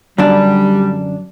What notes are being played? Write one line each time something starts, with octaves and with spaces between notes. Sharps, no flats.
F#2 D3 G3 D4